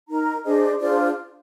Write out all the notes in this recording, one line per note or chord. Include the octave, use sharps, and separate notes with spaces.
D#4 A#4 A#5
D4 G#4 C5 D#5
D4 F4 G#4 C5 D5